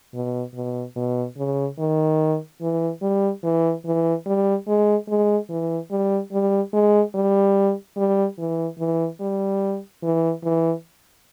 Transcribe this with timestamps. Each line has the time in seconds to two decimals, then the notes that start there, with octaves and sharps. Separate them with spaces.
0.14 B2
0.55 B2
0.96 B2
1.37 C#3
1.79 D#3
2.61 E3
3.02 G3
3.43 E3
3.85 E3
4.26 G3
4.67 G#3
5.08 G#3
5.49 E3
5.91 G3
6.32 G3
6.73 G#3
7.14 G3
7.96 G3
8.38 E3
8.79 E3
9.20 G3
10.03 E3
10.44 E3